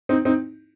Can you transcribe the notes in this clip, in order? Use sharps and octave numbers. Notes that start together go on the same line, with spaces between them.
C4 D#4
C4 D#4